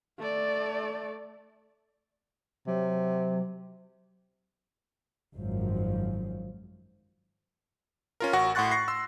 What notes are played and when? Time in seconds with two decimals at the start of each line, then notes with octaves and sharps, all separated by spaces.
0.19 A3 D5
2.67 C3 F#3
5.34 G#1 F#2 F3
8.20 C#4 F4 A#4
8.33 A1 F#4 F#5 C#6 A#6
8.55 A2 F#5 C6 C#6 F#6 A6
8.71 C#6 A#6 C7
8.88 C6 E6